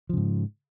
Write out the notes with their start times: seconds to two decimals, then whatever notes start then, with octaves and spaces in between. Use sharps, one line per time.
0.10 F3
0.13 C#3
0.17 G#2